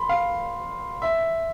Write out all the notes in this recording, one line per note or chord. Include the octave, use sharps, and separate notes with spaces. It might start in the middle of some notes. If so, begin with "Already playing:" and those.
Already playing: B5 C6
F5
E5